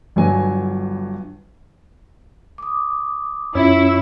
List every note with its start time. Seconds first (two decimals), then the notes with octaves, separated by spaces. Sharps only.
0.16 G1 G2 F#3 G#5
2.58 D6 D#6
3.55 F#2 C#4 E4 F4 C#5 E6